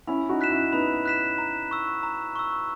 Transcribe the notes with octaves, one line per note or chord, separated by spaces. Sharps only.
C#4 E4 B5
D#4 F#4
F#6 B6 E7
C#4 E4
B3 D#4 B5
F#6 B6 E7
A#5
C#6 E6
A#5
C#6 E6